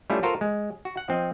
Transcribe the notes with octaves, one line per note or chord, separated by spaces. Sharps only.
G3 A3 C#4 E4 F4
F4 F#4 A4 A#4 C5 F5
G#3
F#4
F#5
F3 C4 D#5